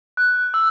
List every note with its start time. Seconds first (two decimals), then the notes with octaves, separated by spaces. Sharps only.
0.17 F#6
0.54 E6